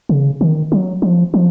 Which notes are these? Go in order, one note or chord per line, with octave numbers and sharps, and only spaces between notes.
C#3
D#3
F#3
F3
F3